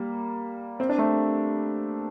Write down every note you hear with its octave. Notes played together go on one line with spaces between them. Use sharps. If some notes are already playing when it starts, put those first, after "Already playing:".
Already playing: G3 A#3
C4
D4
A3 C4